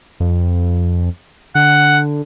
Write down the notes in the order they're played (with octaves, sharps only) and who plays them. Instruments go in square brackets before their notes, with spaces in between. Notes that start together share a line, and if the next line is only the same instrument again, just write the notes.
[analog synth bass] F2
[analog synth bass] D3 [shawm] F#5